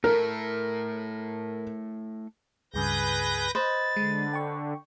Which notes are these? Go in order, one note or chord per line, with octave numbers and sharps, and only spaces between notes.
A3 E4 A4 A#4
C#2 G2 C#3 G#4 B4 G6 A#6
B4 C5 D#5 A6
D3 G#3
G5 C#6